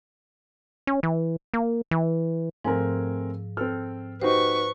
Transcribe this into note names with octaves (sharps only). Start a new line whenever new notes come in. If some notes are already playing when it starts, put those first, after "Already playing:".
C#4
E3
A#3
E3
G#2 F3 A3 C4 A#4 G#5
C4 A4 F6
D#4 F#4 G4 B4 C5 C#6